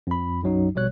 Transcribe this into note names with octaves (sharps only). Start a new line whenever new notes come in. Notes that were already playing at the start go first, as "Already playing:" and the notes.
F2 B5
B1 F#2 F#3 D#4
A#1 B2 G3 C#5 F#6